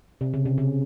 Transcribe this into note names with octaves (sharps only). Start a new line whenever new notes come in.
C3
C#3
C3
C#3